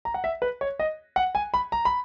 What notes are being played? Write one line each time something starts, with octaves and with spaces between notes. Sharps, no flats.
A#5
F#5
E5
B4
C#5
D#5
F#5
G#5
B5
A#5
B5